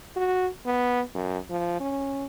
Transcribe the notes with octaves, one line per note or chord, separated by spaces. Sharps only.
F#4
B3
F#2
F3
C#4